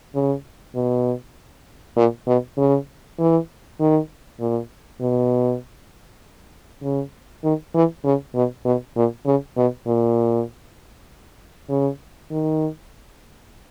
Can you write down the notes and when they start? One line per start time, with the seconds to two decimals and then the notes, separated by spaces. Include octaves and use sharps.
0.15 C#3
0.76 B2
1.96 A#2
2.27 B2
2.57 C#3
3.19 E3
3.80 D#3
4.40 A#2
5.01 B2
6.83 C#3
7.44 D#3
7.75 E3
8.05 C#3
8.35 B2
8.65 B2
8.96 A#2
9.26 C#3
9.57 B2
9.87 A#2
11.70 C#3
12.30 D#3